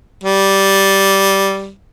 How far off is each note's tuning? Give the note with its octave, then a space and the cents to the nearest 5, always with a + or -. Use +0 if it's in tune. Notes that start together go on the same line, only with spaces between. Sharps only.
G3 -10